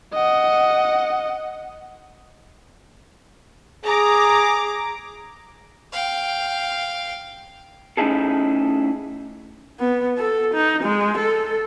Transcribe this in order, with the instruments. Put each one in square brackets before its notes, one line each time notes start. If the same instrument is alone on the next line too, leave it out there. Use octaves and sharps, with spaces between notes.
[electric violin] D#5 F#5
[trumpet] G#4 [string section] A#5 D6
[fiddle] F5 G5
[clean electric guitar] A3 C#4 D#4 E4 G#4 A4
[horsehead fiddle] B3
A4
D#4
G#3
A4